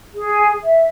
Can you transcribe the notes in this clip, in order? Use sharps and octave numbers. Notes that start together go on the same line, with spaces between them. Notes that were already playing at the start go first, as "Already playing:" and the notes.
G#4
E5